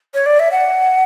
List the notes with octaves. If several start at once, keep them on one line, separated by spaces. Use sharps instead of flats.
C#5
D5
E5
F#5